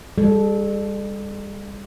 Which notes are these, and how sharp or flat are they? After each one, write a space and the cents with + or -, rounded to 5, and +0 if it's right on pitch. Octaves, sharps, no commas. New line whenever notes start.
G3 +40 A4 -20